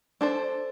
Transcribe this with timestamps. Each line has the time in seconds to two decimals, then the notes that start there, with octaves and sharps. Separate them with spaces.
0.21 D4 A4 C5